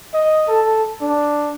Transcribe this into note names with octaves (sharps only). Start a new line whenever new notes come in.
D#5
A4
D4